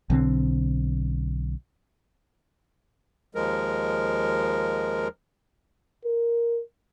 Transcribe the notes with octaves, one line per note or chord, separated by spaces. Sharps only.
B1 D3 G3 C4
D#2 F3 G#3 A#4
A#4